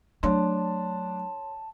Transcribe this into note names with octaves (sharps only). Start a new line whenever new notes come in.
F#3 A3 D4 C#5 A5 C6